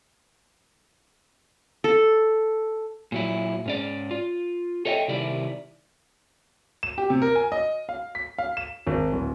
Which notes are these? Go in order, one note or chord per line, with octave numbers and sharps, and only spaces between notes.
A4
A#2 F#3 E4
G#2 C#4 D5
F4
A4 C#5 D#5 E5 G5
C3 D#3 G3 E4 D5
E7
G4
C3
A#4
G#5
D#5
F5
B6
F5
E7
G#1
D1